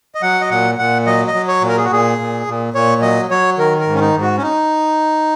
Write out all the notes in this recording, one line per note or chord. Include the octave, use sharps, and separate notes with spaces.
D#5
F#3 F#5
D#5
A#2 F#5
A#2 F#5
F#3 D#5
D#5
F#3
C#5
A#2
A#4
G#4
F#4
A#2 G#4
A#2
A#2
A#2 C#5
F#3 D#5
F#3 C#5
D#3 A#4
A#4
G#2
C#4
D#4
G#2
F#4
C#4
D#4